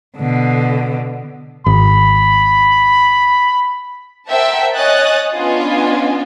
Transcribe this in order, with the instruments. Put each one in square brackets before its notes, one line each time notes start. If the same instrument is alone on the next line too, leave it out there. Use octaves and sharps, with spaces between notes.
[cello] B2 D3
[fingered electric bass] G#1 [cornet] B5
[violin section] A#4 C5 E5 F#5 G5 A5
C#5 D#5 G#5 D#6 F#6 A6
B3 C#4 D4 F4 D#5 G#5